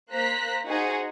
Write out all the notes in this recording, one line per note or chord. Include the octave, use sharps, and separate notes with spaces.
A#3 C5 A#5 F#6 B6
D#4 F#4 G#4 C5 F#5